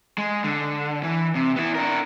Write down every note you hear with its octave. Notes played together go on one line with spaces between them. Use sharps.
G#3
D3
E3
C3
B3 E4
D4 A#4